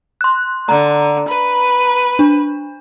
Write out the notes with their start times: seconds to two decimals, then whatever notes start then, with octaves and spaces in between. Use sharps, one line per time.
0.21 C6 F#6
0.69 D3 A#5
1.28 B4
2.19 D4